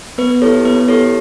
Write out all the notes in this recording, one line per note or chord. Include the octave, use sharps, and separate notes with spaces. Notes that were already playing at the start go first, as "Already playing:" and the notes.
B3 B4
E4 G4 A4 C#5
B3 B4
E4 G4 A4 C#5